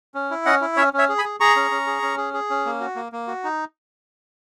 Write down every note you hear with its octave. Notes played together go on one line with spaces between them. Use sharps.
C#4
E4
C#4 D#5 F#5
E4
C#4 C#5 E5
C#4 C#5 E5
G#4
G#5 B5
G#4
G#4 A#5 C#6
C#4
C#4
G#4
C#4
G#4
G#4
C#4
A#3
F#4
A#3
A#3
F#4
D#4